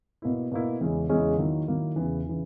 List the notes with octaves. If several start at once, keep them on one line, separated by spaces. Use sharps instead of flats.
B2 A#3 E4
B2 A#3 E4
E2 C#3 G#3 C#4 E4
E2 C#3 G#3 C#4 E4
D#3 F#3 A#3 E4
D#3 F#3 A#3 E4
E2 C#3 E3
C#3 E3